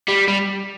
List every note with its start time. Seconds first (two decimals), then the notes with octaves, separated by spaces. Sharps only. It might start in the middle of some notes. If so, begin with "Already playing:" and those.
0.08 G3
0.28 G3